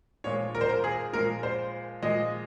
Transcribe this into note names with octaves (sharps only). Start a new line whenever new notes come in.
A#2 F3 G#3 C#5
A#4
C5
A#4
G#4
A#2 F3 G#3 A#4
C5
A#2 F3 G#3 D#5